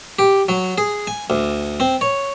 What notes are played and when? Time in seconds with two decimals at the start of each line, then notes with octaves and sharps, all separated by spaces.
0.19 G4
0.49 F#3
0.78 G#4
1.07 G#5
1.30 D2
1.80 C4
2.01 C#5